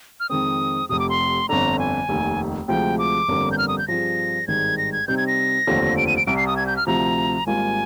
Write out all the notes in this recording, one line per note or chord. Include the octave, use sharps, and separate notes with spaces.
F6
F2 D#3 G#3 C4 D#6
F1 F2 C3 D#6
D6
C6
G1 F2 D3 A#5
G#5
F1 D#2 D#3
D2 C3 F3 G#3 G5
D6
G1 F2 D3 G3 A#3
G6
F6
D#6
G6
G2 F3 C4 F4 G#4 A#6
G#1 G2 D#3 G#3 G#6
A#6
G#6
C3 G3 C4 D#4 G6
G#6
A#6
F1 D#2 D3 F3 C4
D7
D#7
D7
C2 C3 G3 D7
C7
D#6
G#6
G6
F6
D2 C3 F3 A#5
G#1 G#2 G3 A#3 F4 G#5